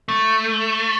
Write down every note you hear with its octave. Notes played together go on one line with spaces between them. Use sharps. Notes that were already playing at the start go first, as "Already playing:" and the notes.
A3